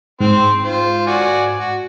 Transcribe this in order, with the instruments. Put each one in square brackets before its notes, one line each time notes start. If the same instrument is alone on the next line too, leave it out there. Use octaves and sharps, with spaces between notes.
[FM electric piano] G#2 [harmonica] C4 C6
[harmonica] F4 C5
F#4 D5 G#5
F#4